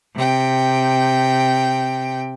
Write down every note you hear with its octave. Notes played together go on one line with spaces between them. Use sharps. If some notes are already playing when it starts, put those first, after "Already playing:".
C3 G5